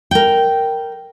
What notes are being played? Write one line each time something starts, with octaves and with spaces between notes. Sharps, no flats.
A#4 G5